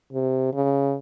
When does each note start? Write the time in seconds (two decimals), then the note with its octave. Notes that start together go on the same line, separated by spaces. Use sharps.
0.13 C3
0.53 C#3